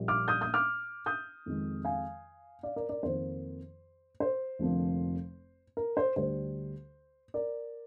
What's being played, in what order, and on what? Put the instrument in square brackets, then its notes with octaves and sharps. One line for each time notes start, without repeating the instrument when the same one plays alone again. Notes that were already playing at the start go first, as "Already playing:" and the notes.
Already playing: [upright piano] A#1 A#2 G3
D6 F6
D#6 G6
D#6 G6
D6 F6
D#6 G6
F2 D#3 G#3
F5 G#5
D5 F5
A#4 D5
A#4 D5
F2 D#3 A#3 C5
C5
F1 F2 D3 F3 A#3
A#4
C5
D2 D3 G3 C5
A#4 D5